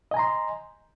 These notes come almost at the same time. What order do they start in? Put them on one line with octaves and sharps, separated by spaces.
D#5 G#5 A#5 C6